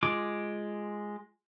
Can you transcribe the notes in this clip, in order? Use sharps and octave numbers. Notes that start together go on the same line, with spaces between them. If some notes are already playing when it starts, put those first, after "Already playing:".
G#3 F4 D6